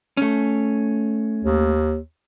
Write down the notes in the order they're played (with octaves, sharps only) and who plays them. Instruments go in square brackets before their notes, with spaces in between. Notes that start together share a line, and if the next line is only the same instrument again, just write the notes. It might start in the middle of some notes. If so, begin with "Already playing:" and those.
[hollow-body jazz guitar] A3 C#4
[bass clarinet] D#2